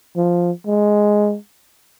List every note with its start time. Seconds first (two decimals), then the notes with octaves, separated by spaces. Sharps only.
0.16 F3
0.67 G#3